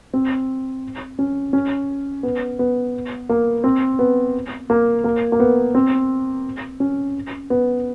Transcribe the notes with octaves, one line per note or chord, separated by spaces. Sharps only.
C4
C#4
C#4
B3
B3
A#3
C4
B3
A#3
A#3
A#3
B3
C4
C#4
B3